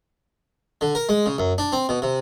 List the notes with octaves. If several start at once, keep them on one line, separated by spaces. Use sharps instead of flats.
D3
A#4
G#3
C#3
F#2
D4
C4
B2
C3